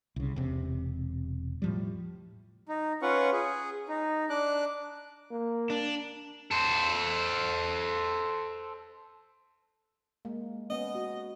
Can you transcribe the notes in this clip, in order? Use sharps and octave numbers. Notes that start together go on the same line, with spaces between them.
C2 C#3
E1 C3
A2 F3 G3
D#4
C#4 F4 B4 F#5 C#6
G#4
D#4
D4 D6 F#6
A#3
D4
A4 C5
G#3 A#3
B3 C#4 D#5
F#4